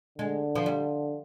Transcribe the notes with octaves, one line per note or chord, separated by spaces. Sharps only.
D3 G#3
F3
G3